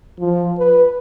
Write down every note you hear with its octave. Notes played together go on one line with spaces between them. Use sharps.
F3
B4